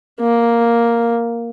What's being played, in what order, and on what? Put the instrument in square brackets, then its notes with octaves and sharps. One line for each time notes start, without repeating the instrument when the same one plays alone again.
[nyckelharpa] A#3